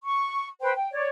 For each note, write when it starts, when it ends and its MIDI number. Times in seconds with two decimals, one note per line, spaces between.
0.04 0.47 85
0.61 0.71 71
0.61 0.71 72
0.61 0.71 79
0.75 0.88 79
0.92 1.09 73
0.92 1.09 74